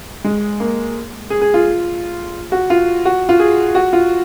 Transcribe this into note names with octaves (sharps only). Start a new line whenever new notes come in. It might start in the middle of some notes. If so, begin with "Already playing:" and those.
G#3
A#3
G#4
G#4
F4
F#4
F4
F#4
F4
G#4
F#4
F4